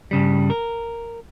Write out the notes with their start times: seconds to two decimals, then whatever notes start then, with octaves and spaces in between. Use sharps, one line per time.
0.11 G2 C#3 G3
0.50 A#4